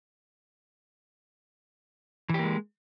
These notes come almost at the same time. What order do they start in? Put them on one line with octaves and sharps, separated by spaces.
E3 G4 A#3 G#3